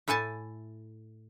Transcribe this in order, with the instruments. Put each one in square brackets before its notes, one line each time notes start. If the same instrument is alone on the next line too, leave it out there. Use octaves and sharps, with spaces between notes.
[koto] A2 E4 A4 G#5 A5